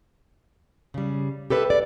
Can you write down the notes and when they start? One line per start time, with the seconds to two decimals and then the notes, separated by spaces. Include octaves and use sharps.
0.94 C#3 G3
1.50 G4 A4 B4 D5 E5
1.70 D5